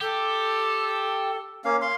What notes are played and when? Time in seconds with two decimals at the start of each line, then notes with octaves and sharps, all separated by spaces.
0.01 G4 A4
1.65 A#3 C#4 F5
1.82 F5 C6